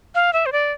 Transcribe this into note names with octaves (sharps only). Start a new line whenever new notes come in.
F5
E5
C5
D5